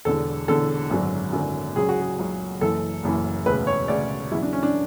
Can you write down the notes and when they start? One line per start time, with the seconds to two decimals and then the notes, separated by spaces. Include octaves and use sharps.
0.05 E1 E2 D3 A4
0.48 E1 E2 D3 A4
0.90 G#1 F#2 D3 F#3
1.33 G#1 F#2 D3 F#3
1.75 C#2 C#3 F#3 G#4
1.89 F#4
2.01 G#4
2.18 C#2 C#3 F#3
2.61 F#1 F#2 E3 A4
3.03 F#1 F#2 E3
3.46 E1 D2 C#3 B4
3.67 C#5
3.88 E1 D2 C#3 D5
4.31 E2 C#3 F#3 E4
4.42 D4
4.53 C#4
4.63 D4